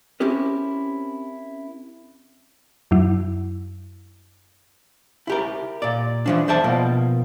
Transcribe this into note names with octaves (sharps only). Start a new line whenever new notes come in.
C4 C#4 E4 G4 A#4
F#2 F#3 E4
E4 G4 A#4
A#2 D5
E3 F3 D4
E2 C5 D5 E5 G5 A5
B2 F3 A#3